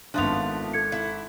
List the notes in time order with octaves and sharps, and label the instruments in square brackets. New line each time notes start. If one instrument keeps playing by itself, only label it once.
[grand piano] G#1 F#6 [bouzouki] F3 A3 B3 [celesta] D4 C6 F7
[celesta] A4 G#6 C#7
[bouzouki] E4